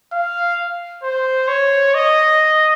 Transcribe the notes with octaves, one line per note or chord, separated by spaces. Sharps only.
F5
C5
C#5
D#5